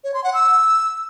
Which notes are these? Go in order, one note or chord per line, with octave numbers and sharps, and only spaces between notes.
C#5
C6
F#5
E6